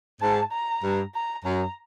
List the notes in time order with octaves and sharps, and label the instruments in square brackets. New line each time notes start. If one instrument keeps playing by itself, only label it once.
[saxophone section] G#2 [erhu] A5
[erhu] A#5
[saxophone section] G2
[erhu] A#5
[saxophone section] F#2 [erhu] A#5